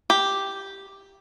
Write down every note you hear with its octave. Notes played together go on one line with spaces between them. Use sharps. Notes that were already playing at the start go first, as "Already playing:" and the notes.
G4